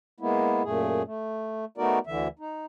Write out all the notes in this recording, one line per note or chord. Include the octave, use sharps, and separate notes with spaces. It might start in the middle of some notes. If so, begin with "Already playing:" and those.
G#3 A#3 B3 E4
F#2 A#2 A3 G#4
A3
A3 B3 D#4 F#4 A#4 D5
D2 D3 E3 E5
D#4